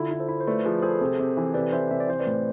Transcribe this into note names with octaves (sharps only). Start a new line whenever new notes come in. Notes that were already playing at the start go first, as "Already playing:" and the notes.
Already playing: D3 E4 F4 A4
E4
A4 C5
E4
C5
A3 B4 D5
F3 G#4 B4
G#4 A4 C5
C3
C3
E3
C3 B4 D5
E3 C5 E5
C3 E5
D5
E3 C5
B4 D5
A2